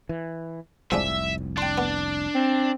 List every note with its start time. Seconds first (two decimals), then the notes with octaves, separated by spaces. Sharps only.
0.09 E3
0.92 F1 C2 F3 G#3 D4 E5
1.58 D4 G5 C6
1.78 B3
2.35 C4